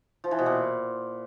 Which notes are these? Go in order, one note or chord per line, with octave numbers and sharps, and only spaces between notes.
F3
E3
B2
A#2